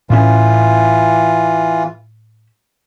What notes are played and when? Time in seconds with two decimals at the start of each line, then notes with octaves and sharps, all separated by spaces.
0.10 A2 E3 C#4 F4